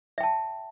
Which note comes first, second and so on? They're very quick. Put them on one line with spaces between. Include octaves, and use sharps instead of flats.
E5 G5 A5